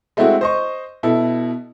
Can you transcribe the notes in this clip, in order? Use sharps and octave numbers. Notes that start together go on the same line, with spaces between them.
G#3 A3 C4 E4 F#4
C5 D#5 C#6
B2 E4 A4